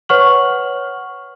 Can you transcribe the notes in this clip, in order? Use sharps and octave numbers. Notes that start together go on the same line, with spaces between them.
B4 C#5 F#5 C#6 F6 F#7